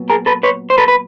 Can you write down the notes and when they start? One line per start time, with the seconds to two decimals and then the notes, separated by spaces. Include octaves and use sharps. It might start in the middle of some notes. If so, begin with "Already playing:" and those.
Already playing: A#2 F#3 B3
0.10 G#4 A#4
0.26 A4 B4
0.43 B4 C#5
0.70 C5
0.78 A4 B4
0.88 B4